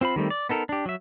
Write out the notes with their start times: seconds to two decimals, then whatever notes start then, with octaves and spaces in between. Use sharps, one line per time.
0.01 C4 F4 C5 B5
0.16 D#3 G3 A3 C4
0.30 D5
0.49 B3 D#4 A4 A#4
0.69 D4 G4
0.86 F#3 E5